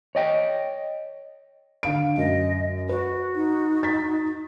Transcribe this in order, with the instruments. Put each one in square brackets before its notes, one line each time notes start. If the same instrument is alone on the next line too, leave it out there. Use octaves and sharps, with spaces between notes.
[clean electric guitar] C#5 D#5 G5
[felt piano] D3 F5 D7
[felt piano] F#2 [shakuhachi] D#5
[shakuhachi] F#4 [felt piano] B4
[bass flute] D#4
[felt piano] A6 B6